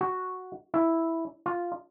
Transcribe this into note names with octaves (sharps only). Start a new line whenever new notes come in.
F#4
E4
F4